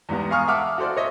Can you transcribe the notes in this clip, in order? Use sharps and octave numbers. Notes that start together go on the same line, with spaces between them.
E2 G#2 G3 B3
F5 G#5 A#5 C#6 D#6 F6
E5 F#5 A5 D6 F6
F#4 A4 C5 D5
C#5 D#5 E5